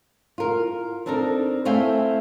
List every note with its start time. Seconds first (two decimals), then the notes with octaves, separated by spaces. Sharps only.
0.38 F4 A#4
1.06 C4 D4 D#4 A4 A#4
1.65 A3 C4 E4 F5 G5 G#5